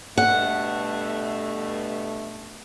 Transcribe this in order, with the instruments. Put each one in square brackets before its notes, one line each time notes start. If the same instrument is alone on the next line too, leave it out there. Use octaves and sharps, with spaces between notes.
[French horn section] G2 B2 A3 [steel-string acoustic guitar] F#5